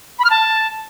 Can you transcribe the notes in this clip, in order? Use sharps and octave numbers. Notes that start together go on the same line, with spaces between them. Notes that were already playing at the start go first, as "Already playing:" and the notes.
B5
F6
A5